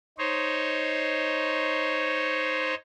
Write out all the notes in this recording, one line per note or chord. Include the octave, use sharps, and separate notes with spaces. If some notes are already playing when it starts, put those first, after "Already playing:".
D#4 C5 C#5